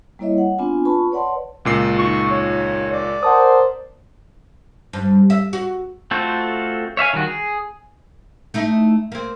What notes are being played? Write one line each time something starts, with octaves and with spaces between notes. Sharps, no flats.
G3 A#3 E4 C#5 D#5 E5
F#5
B3 C4 D4 F4 G#5
F4 B4 A5 B5 C#6
B4 C#5 D5 F#5 A5 C6
C#2 A#2 C7
D#4 F4 C#6
C#5
D5
A#4 C5 F#5 A5 D#6
G2
E5
F#4
A3 C4 F4 F#4 A4
C#5 E5 F5 G#5
D#3 G3 F#4
G#4
A3 D#4 E4
A#3 C4